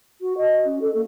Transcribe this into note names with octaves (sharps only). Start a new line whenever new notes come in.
F#4
D#5
C#4
A4
A#3